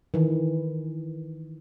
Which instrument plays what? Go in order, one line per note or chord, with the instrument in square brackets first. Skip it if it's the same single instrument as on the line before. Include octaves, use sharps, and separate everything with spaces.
[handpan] D#3 E3